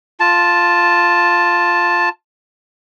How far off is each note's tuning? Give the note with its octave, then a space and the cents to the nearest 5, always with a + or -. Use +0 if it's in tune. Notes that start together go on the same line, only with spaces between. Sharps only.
F4 +0 A5 +0